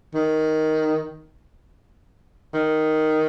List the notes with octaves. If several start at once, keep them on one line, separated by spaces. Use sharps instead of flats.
D#3
D#3